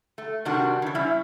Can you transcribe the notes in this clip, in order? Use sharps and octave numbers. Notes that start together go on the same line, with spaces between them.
A3
C3 D#3 G3 D4 F#4
C#3 E3
G3 C#4 E4 E5